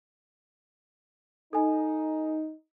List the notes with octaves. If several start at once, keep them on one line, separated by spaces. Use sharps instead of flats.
D#4 A4 G#5